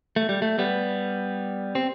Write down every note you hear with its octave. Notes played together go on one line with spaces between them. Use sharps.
A3
G3
A3
G3 B3
C4